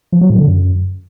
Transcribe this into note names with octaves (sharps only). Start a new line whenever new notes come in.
F3
F#3
A2
D3
F#2